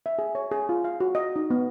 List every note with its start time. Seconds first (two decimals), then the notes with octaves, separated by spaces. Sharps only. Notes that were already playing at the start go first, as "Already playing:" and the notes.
0.06 E5
0.19 G#4
0.35 C#5
0.51 G#4
0.69 F4
0.84 F5
1.00 F#4
1.15 D#5
1.36 D#4
1.50 B3